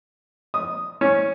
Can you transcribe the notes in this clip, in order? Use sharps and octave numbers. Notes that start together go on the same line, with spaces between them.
D#6
C#4